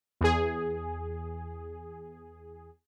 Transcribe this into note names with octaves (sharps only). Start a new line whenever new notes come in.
E2 G#4